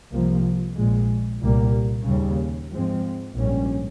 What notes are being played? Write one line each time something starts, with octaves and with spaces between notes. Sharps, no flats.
C2 C3 F3 A#3
A#1 A#2 G#3
C2 A#2 G3 A#3
D#2 C#3 G3
G#2 F3 G#3 C4
A#1 G#2 G3 C#4